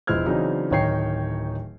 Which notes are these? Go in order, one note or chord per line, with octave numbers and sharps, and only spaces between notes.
E1 F3 E4 C5 F6 G#6
C#3 E3 F#3 C4 D4 D#4
D1 D#3 D#4 C#5 G5 C7